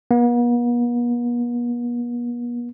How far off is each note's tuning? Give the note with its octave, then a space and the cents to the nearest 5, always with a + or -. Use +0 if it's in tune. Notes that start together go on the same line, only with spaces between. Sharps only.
B3 -45